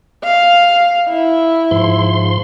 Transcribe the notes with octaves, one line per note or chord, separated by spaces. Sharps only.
F5
E4
G#2 F3 C6